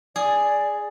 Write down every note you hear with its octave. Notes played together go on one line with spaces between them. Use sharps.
G#4 D5